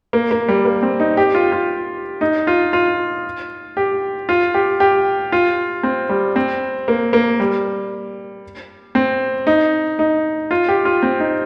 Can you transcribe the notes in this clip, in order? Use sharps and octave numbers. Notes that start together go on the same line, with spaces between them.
A#3
A#3
G3
A#3
C4
D#4
G4
F4
F4
D#4
F4
F4
G4
F4
G4
G4
F4
C4
G3
C4
A#3
A#3
G3
C4
D#4
D#4
F4
G4
F4
C4
D#4